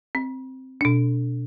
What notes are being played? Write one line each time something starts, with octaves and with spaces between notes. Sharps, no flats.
C4
B2 D4